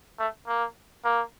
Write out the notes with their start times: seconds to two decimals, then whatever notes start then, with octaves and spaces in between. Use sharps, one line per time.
0.19 A3
0.47 A#3
1.04 A#3